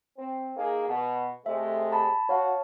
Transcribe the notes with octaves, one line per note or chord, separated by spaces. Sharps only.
C4
A#3 D#4 G#4
B2
C3 G#3 A3 E5
A5 B5
F#4 C#5 F5 A5